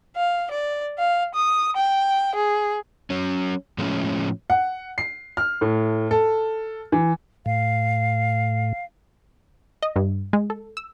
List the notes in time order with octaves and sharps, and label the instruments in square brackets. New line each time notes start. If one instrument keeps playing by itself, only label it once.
[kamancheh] F5
D5
F5
D#6
G5
G#4
[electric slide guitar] F#3 C#4
A2 F3 G#3 A3 C#4
[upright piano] F#5
C7
F6
A2
A4
E3
[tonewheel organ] A2 [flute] F5
[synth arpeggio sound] D#5
G2
G#3
A4
E6